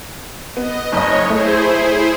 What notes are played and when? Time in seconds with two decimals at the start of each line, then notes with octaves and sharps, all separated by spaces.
0.57 B3 D#5
0.92 F#1 C#5 D#5
1.29 A3 E4 G#4 C5